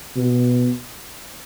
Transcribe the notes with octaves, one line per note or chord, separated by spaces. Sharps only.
B2